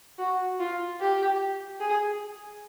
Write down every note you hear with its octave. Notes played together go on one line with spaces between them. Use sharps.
F#4
F4
G4
G#4